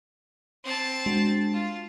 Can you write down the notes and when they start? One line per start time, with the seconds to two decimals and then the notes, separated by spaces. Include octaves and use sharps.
0.64 C4 A5
1.06 G#3 D4 F#4
1.53 F4